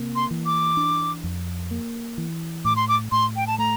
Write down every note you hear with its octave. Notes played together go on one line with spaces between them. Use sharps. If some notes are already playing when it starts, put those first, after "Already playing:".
Already playing: C3 A#3
C6
E3
D6
D4
F2
A#3
E3
A2 D6
C6
D6
A2 C6
G5
A5
A3 A#5